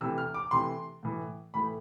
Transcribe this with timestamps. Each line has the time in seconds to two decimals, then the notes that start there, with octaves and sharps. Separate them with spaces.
0.01 C3 E3 A3 E6
0.18 F6
0.34 D6
0.51 C3 E3 A3 C6
1.03 A2 E3 A3
1.54 A2 E3 A3 B5